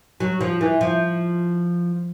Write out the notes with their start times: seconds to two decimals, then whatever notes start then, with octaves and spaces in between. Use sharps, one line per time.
0.20 F#3
0.41 F3
0.61 E3
0.81 F3